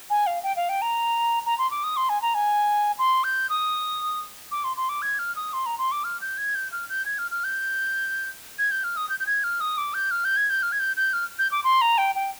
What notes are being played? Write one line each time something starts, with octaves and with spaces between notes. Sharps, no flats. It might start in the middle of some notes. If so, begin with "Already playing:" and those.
G#5
F5
G5
F5
G5
A#5
A#5
C6
D6
D#6
C6
G#5
A#5
G#5
C6
G6
D#6
D6
C6
C6
D6
G#6
F6
D#6
C6
A#5
C6
D6
F6
G6
G#6
G6
F6
G6
G#6
F6
F6
G6
G#6
G6
F6
D#6
G6
G6
G#6
F6
D#6
D6
G6
F6
G6
G#6
G6
F6
G#6
G6
G6
F6
G6
D6
C6
A#5
G5
G5